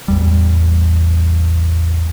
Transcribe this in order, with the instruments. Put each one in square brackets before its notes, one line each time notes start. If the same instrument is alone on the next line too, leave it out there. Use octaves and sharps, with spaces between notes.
[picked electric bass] A1 E2 G3